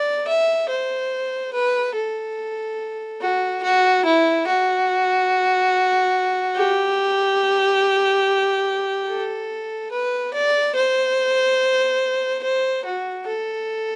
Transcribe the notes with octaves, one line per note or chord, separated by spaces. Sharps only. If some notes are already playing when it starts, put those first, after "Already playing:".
Already playing: D5
E5
C5
B4
A4
F#4
F#4
E4
F#4
G4
A4
B4
D5
C5
C5
F#4
A4